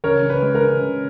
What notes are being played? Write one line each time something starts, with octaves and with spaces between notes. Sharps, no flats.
C#3 A#4 C#5
C#3
B4
G#3
A#4
C#3
C#3